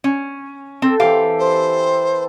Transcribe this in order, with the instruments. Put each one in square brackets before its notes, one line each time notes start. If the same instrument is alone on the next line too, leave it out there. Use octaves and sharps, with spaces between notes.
[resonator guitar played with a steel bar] C#4
[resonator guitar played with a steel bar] C4 [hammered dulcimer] A4
[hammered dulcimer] E3 C4 [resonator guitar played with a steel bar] G4 F5
[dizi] C5